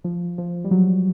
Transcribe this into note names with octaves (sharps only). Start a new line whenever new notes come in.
F3
F3
G3
F#3